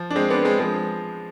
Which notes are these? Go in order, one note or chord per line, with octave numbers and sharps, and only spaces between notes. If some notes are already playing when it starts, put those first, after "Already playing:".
Already playing: F3
D4
G#3 C4
B3 D4
G#3 C4
F3 G#3